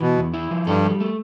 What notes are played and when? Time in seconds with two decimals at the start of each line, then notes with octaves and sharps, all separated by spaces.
0.01 B2 E3
0.17 E2
0.34 E4
0.51 F3
0.67 G2 A4
0.84 G3
1.00 A3